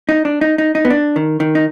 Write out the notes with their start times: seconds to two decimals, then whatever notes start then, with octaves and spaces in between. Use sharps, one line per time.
0.09 D#4
0.25 D4
0.41 D#4
0.58 D#4
0.75 D#4
0.85 B3
0.90 D4
1.16 D#3
1.40 D#3
1.55 D#4